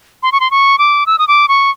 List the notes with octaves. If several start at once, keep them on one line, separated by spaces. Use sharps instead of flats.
C6
C#6
C6
C#6
D6
E6
D#6
D6
C#6